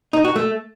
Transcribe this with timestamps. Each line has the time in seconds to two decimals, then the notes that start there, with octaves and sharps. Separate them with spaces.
0.13 D#4
0.24 F#4
0.36 A3